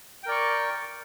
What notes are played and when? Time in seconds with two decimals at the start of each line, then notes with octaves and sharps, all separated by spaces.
0.23 G5
0.26 A#4
0.29 D5
0.31 C#6